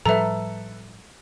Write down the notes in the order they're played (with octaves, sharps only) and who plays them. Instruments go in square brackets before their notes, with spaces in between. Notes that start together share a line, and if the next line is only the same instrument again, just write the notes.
[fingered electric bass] A2 F3 G3 [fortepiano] A4 B4 [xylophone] E5 A#5